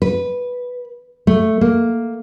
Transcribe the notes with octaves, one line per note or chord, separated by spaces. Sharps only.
B4
A3
A#3